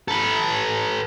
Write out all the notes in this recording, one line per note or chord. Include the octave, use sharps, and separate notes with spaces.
A4 B4